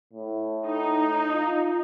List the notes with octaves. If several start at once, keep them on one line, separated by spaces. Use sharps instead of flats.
A2
D#4
F4